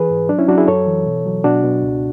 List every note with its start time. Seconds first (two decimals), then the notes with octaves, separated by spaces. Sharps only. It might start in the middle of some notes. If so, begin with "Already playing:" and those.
Already playing: E3 G#4 B4
0.10 G#2
0.29 F#3 D4
0.38 C#4 E4
0.48 F#3 D4 F#4
0.58 E4 G#4
0.67 F#2 A4 C#5
0.87 E3
1.06 B2
1.25 F#3
1.44 B2 D4 F#4
1.64 B2
1.83 C#2